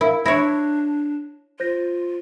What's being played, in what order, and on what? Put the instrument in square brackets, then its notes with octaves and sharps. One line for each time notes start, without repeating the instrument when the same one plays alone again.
[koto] E4 [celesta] A#4 F5
[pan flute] D4 [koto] E4 C#5 [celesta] G#6 A#6
[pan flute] F4 [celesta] C5 G6 A#6